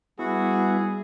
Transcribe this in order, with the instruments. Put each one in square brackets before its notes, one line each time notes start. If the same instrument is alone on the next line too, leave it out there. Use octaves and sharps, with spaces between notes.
[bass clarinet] G3 [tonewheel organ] B3 E4 [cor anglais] F#4 [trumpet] G#4